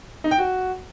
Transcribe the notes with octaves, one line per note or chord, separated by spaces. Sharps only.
D#4
G5
F#4